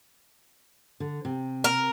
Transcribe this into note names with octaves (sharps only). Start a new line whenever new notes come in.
D3
C3
A#4